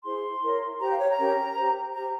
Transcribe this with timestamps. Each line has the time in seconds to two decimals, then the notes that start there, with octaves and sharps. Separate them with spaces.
0.05 E4 G#4 C5 C6
0.42 E4 A#4 C#5
0.80 G4 C5 A#5
0.90 F5
1.00 C#5
1.10 A#5
1.19 C#4 G4 A#4 C#5
1.57 G4 C5
1.95 G4 C5 A#5